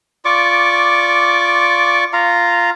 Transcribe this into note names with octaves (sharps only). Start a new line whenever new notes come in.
F4 D5 C#6 D6
F4 F5 A#5